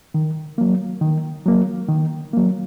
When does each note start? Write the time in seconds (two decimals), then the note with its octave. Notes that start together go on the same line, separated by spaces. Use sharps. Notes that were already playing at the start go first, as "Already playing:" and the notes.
0.14 D#3
0.58 F#3 A#3
1.01 D#3
1.46 F#3 A#3
1.89 D#3
2.33 F#3 A#3